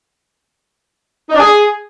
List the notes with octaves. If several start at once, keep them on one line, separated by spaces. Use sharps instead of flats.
D#4
D4
G#4